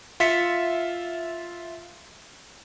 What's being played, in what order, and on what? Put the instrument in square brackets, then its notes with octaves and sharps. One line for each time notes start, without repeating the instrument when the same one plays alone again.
[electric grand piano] F4 E5 B6 C#7